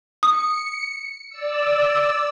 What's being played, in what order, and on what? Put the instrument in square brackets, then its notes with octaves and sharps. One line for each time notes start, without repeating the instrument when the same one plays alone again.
[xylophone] D#6 [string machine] C#7
[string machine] D5 E6